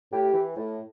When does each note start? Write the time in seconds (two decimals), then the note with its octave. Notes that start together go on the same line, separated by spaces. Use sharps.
0.13 A2 G4
0.34 E3
0.56 A2